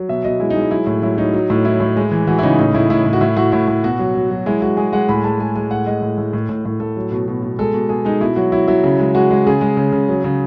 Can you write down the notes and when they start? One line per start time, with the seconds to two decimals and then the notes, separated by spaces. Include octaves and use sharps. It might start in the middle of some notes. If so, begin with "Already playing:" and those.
Already playing: F#3
0.09 B2 E5
0.24 B2 D#5
0.40 G#3 E4
0.50 D#4
0.56 G#3 E4
0.71 F#3 E4
0.87 A2
1.02 F#3 E4
1.18 F#3 D#4
1.34 F#3
1.50 A2
1.65 F#3 E4
1.80 A2
1.97 G#3
2.11 E3
2.27 E3 F#4
2.39 E4
2.43 C#3 D#4
2.59 A2 D#4
2.74 A2 E4
2.90 A2 E4
3.06 A2
3.13 F#4
3.21 A2 E4
3.37 A2 F#4
3.52 A2 E4
3.68 A2
3.83 B2 F#4
3.99 F#3
4.15 F#3
4.31 F#3
4.46 G#3 E4
4.62 G#3 F#4
4.77 G#3 G#4
4.93 G#3 F#5
5.09 A2 B5
5.24 G#3 A5
5.40 G#3 G#5
5.56 G#3 G#5
5.71 A2 F#5
5.87 G#3 D#5
6.02 A2
6.18 A2
6.33 A2
6.49 A2
6.65 A2
6.80 A2 A4
6.97 F#3
7.12 B2
7.28 B2
7.42 B2
7.59 G#3 A4
7.74 B2
7.89 B2 G#4
8.05 G#3 D#4
8.21 B2 E4
8.36 F#3 F#4
8.52 F#3 E4
8.68 F#3 E4
8.84 C#3
8.99 G#3
9.15 G#3 F#4
9.30 G#3
9.47 C#3 G#4
9.61 G#3
9.77 C#3
9.92 C#3
10.09 F#3
10.24 C#3